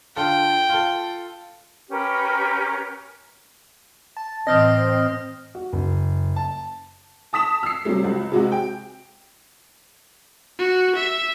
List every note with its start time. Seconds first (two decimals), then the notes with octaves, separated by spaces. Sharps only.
0.16 D3 F4 A4 G5
0.69 F4 A4
1.89 C#4 G4 A#4 B4
4.17 A5
4.47 A2 E3 C4 D#5 D#6 F6 A#6
5.55 F#4
5.73 F#1
6.36 A5
7.33 A5 D#6 B6 E7
7.63 E6 C7
7.85 C3 F#3 G3 A3
8.04 C#2
8.32 C3 G#3 F#4
8.52 G5
10.59 F#4
10.96 E5